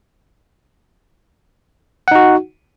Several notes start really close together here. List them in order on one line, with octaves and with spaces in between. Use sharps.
F#5 D#4 F#4